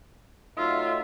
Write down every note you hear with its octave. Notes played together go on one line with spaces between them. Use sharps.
F#3 A3 D#4 F4 E5